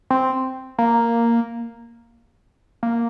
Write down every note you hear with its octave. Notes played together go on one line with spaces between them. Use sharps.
C4
A#3
A#3